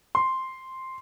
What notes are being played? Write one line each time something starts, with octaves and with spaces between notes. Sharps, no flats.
C6